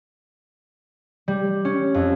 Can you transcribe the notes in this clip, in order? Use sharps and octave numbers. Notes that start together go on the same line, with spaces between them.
G3
C#4
F2